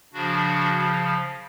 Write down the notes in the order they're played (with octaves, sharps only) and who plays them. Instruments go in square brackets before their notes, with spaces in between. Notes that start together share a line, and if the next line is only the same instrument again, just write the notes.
[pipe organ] C#3 F3 D4 F#4